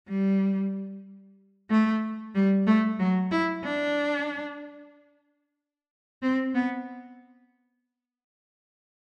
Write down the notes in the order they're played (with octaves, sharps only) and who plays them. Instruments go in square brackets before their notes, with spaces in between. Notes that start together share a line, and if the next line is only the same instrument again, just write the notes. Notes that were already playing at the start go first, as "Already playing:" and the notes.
[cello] G3
A3
G3
A3
F#3
E4
D4
C4
B3